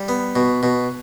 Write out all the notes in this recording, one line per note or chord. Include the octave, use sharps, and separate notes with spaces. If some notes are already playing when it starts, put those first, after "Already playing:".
Already playing: G3
B3
B2
B2